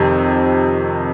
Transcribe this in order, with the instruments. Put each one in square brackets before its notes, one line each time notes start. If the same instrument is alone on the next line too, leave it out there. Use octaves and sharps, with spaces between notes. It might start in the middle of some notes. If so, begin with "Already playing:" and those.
Already playing: [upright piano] F2 C3 D#3